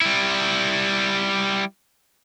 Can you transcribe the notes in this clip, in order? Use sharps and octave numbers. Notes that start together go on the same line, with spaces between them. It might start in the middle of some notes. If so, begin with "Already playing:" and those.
G3 E4